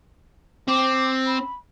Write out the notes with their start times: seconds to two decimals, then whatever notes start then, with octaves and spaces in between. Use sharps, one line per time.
0.68 C4 D6
1.26 B5